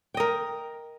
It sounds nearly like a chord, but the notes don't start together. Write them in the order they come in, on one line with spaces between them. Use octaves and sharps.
G5 D#5 A#4